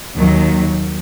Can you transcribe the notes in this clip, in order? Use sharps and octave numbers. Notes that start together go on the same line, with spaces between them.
D#2 D#3 F#3